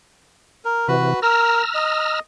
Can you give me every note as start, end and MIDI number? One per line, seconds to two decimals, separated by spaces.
0.65 0.88 70
0.88 1.14 48
0.88 1.14 52
0.88 1.20 66
0.88 1.20 71
1.22 1.62 70
1.22 2.19 82
1.22 2.19 88
1.22 2.19 89
1.75 2.20 75